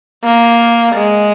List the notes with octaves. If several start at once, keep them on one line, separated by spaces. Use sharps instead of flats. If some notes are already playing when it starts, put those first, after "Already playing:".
A#3
G#3